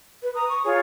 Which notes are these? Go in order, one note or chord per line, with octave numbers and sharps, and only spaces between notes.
B4
A#5 D#6
C#6
F4 G#4 C#5